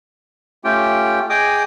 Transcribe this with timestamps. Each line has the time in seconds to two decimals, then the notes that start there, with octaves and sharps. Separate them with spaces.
0.64 A3 C#4 F4 G4 G5
1.30 G#4 D#5 G5 G#5 D6 D#6